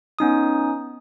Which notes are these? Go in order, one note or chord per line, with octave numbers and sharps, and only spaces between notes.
B3 C#4 D#4 D#6